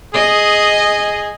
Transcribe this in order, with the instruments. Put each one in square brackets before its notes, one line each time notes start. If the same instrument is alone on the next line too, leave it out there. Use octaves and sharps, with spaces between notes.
[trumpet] G#4 [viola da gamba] D#5